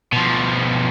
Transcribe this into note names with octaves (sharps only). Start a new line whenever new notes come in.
B2 F3